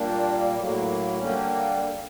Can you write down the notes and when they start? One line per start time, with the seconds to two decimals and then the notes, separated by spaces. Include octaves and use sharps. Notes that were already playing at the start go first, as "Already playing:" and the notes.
Already playing: A#2 G3 A#3 D4
0.56 A2 F#3 A#3
1.17 D3 G3 A#3 C#4